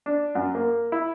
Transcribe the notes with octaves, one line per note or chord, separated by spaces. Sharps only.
D4
F#2
A#3
E4